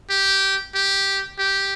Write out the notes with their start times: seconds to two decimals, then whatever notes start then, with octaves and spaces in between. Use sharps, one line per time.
0.10 G4
0.75 G4
1.39 G4